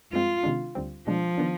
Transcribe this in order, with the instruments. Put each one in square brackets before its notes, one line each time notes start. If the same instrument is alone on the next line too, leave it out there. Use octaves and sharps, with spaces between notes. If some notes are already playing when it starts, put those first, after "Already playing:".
[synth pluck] G2 F3 G#3 C4 [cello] F4
[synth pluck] C3 D#3 G#3 D4
D2 D3 G3 C4
[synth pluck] B2 G#3 D4 [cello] F3
[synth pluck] D#3 B3 D4